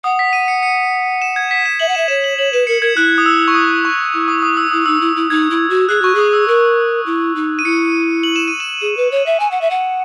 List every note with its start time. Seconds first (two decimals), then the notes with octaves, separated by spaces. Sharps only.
0.04 F#5 D#6
0.19 B6
0.33 D#7
0.48 C#7
0.63 C#7
1.22 E7
1.36 G#6
1.51 B6
1.66 E7
1.80 E5 F#7
1.88 F#5
1.95 E5 E7
2.08 C#5 E7
2.24 F#7
2.38 C#5 F#7
2.53 B4 E7
2.67 A#4 C#7
2.82 A#4 G#6
2.97 E4 F#6
3.18 D#6
3.26 E6
3.48 C#6
3.55 D#6
3.85 C#6
4.14 E4
4.28 D#6
4.43 D#6
4.57 E6
4.71 E4 D#6
4.86 D#4 E6
5.01 E4
5.16 E4
5.30 D#4 G#6
5.51 E4
5.70 F#4
5.89 G#4 F#6
6.02 F#4 C#6
6.15 G#4 D#6
6.33 E6
6.48 A#4
7.06 E4
7.36 D#4
7.59 D#7
7.65 E4 C#7
8.23 F#7
8.36 E7
8.48 D#7
8.60 E7
8.81 G#4
8.97 B4
9.12 C#5
9.26 E5
9.40 G#5
9.51 F#5
9.61 E5
9.71 F#5